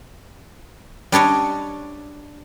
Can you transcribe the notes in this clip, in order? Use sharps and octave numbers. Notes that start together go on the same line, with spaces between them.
G3 D4 C#5 D#5